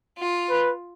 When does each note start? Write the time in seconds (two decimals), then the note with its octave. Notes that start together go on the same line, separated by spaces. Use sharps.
0.18 F4
0.50 B4